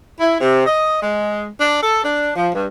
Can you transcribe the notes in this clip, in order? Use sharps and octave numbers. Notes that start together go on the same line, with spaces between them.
E4
C3
D#5
G#3
D4
A4
D4
F3
G2